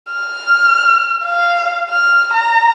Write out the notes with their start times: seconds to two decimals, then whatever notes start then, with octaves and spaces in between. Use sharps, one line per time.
0.13 F6
1.24 F5
1.90 F6
2.33 A#5